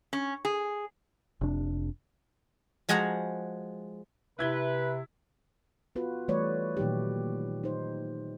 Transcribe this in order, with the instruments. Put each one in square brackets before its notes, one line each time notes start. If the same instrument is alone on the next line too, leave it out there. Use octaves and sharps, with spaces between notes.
[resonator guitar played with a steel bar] C#4
G#4
[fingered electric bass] F1 C3 D4
[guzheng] F3 G#3 F#4 G#4 F#5 A#5
[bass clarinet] C3 [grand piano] E4 G#6 G7 [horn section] B4
[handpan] B3 F4 F#4 B4
E3 G3 A3 B4 C#5 D5
A#2 D#3 F#3 D#4 G4
D#4 C5